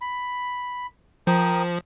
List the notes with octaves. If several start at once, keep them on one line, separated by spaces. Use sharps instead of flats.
B5
F3 A#4 G5 D#6